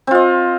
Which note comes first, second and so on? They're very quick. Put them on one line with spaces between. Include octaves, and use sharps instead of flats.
C4 F4 D#5